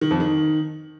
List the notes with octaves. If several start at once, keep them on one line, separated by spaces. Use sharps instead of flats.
D#3
F2
D#3